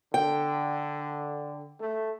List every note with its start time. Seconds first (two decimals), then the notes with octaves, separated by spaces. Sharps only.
0.14 D3 G5
1.80 A3